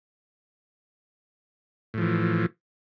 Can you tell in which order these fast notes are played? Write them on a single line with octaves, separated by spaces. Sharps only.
A2 F3 E3